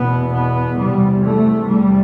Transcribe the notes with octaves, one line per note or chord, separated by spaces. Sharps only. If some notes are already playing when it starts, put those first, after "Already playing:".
Already playing: E2 B2 B3
B3
E2 C3 G3
A3
E2 C3 G3